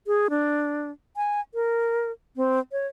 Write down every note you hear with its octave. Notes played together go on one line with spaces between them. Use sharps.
G#4
D4
G#5
A#4
C4
C#5